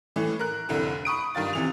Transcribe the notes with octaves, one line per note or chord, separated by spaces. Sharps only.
A2 E3
A#4 F#6
F1 C2 D3 E4
B5 C#6 D#6 D7
G2 D#3 F4 A6
C3 E3 F7